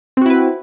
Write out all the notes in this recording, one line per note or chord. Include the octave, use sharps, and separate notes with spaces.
C4 E4 F#4 B4